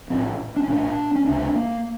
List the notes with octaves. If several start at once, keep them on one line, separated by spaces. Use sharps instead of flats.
A#1 A2 C4
D4
C#4
A#1 A2 D4
C#4
C#2 C3 D4
A#3